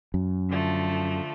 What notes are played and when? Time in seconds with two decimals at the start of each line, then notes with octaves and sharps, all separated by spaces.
0.14 F#2
0.50 D3 F3 A3